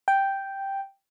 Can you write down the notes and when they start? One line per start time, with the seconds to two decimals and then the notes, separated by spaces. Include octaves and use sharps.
0.08 G5